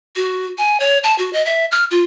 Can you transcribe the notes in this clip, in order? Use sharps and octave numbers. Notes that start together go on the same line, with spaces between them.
F#4
G#5
C#5
A5
F#4
D#5
E5
F6
F4